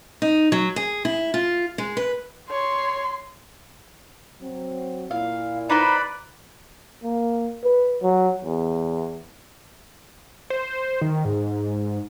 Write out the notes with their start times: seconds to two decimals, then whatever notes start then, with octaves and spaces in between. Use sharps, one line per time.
0.22 D#4
0.52 F#3
0.76 G#4
1.05 E4
1.34 F4
1.78 G#3
1.97 B4
2.51 C#5 C6
4.41 F#3 C4
5.11 A#2 E4 F5
5.70 D#4 B4 C5 D5 B5
7.03 A#3
7.64 B4
8.03 F#3
8.44 E2
10.50 C5
11.01 D#3
11.25 G#2